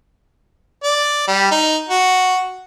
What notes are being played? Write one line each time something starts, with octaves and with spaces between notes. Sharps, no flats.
D5
G3
D#4
F#4